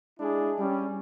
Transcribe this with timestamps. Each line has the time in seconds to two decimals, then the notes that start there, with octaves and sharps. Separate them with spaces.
0.18 G#3 D4 E4 G#4
0.58 G3 C#4